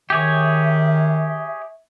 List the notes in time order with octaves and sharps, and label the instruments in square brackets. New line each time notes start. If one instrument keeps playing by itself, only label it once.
[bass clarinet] D#3 [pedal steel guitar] G4 G#4 C#5 [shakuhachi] E5